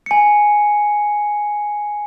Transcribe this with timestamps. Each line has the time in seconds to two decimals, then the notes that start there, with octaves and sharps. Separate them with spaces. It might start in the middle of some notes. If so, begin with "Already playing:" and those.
0.06 G#5 C#7